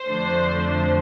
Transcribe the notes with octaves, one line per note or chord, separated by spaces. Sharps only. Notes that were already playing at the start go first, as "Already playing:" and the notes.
Already playing: C5
F2 D3 F3 A3 D4